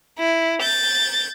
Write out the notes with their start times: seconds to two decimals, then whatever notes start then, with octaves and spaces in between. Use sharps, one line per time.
0.19 E4
0.62 G6 A6